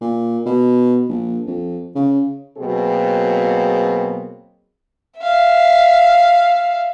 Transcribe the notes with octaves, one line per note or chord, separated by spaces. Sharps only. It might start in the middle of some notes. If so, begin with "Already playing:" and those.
A#2
B2
A#1
F2
C#3
B2 F#3 A#3 C4 G#4
E5 F5